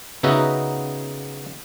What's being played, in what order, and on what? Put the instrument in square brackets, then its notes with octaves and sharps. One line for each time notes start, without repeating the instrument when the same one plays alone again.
[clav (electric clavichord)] C#3 B3 D#4 F#4 E5 A#5